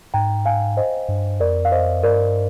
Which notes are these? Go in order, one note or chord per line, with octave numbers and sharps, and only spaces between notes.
G#2 G5 A#5
F5 G#5
C5 D#5
G2
F2 A#4 D5
F5
C5 D#5
G2 A#4 D5